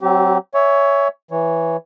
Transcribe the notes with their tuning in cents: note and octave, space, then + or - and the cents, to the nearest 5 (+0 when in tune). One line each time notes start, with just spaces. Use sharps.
F#3 +20 C4 +15 G4 -30
C#5 +15 E5 +0 G#5 -15
E3 +5 C#5 +0